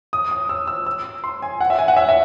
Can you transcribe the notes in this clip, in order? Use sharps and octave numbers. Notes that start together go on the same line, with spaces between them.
D#6
D#6
E6
E6
E6
C6
G#5
F#5
E5
G#5
F#5
E5
E5